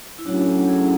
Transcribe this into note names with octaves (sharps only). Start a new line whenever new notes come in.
E4
A2 F#3 C#4 D4 F#4
E4 G#4